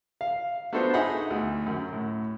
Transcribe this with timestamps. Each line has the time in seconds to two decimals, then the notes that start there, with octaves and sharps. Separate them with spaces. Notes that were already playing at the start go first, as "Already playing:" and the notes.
0.21 F5
0.73 B3 D4 F4 F#4 A4 C5
0.93 D#4 G#4 E5 F#5 G#5 B5
1.30 D2
1.66 F#2
1.92 A2